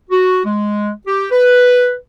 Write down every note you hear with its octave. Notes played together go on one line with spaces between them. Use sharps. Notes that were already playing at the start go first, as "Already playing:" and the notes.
F#4
G#3
G4
B4